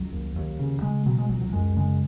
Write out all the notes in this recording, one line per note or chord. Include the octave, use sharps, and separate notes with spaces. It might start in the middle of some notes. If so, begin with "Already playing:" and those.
Already playing: C#2 F#3
D#2
D#2
C#3
C#3 G#3
B2 F#3
G#3
C#2 F#3
F#3
F#2 G#3
C#3 G#3